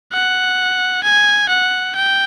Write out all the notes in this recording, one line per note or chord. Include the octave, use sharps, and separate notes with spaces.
F#5
G#5
F#5
G5